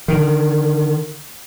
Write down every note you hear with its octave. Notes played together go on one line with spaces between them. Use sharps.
D3 D#3